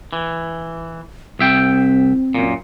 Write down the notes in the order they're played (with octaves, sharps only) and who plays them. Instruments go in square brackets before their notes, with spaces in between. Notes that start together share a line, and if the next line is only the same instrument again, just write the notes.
[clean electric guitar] E3
[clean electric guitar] C2 E5 G5 [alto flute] C4
[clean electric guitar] F#2 A#2